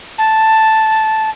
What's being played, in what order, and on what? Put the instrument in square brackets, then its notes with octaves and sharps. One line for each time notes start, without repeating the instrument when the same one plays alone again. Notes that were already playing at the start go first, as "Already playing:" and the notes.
[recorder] A5